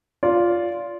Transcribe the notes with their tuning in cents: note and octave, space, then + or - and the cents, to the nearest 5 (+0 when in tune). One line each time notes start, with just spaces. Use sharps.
F4 +0 D5 -25